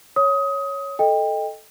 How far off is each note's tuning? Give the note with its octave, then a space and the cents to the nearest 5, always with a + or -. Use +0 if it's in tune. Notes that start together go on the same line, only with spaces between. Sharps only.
C#5 +0 D#6 +20
A4 -5 D#5 +0 G5 +25